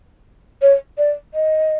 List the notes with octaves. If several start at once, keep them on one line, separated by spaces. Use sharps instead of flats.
C#5
D5
D#5